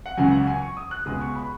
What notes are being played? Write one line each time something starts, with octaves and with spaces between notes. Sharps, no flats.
F#5
C#2 C#3 F#3 G#5
F#5
G#5
C#6
D#6
F#6
C#2 B2 G#3 D#6
C#6
B5